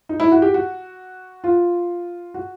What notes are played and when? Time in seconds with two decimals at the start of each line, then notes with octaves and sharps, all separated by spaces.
0.09 D#4
0.20 E4
0.32 F#4
0.42 G4
0.54 F#4
1.44 F4
2.34 F#4